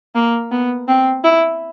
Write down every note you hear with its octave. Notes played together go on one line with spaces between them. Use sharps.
A#3
B3
C4
E4